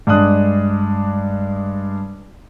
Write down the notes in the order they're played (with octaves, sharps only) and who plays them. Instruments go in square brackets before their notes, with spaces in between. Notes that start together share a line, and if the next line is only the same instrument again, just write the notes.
[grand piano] G2 G#3 D4 D#6 F#6